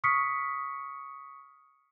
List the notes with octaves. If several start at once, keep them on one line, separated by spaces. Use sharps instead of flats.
C#6 D#6 F6 B6 C#7